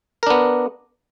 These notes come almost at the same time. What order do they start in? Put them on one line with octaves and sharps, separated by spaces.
A#4 D4 B3